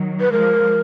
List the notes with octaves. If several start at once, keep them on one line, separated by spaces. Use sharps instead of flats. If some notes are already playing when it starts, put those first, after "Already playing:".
Already playing: D#3 F#3
B4
F3 G#3 A#4